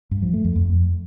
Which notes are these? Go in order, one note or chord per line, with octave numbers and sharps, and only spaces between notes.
G2
F3
A3
F2
F2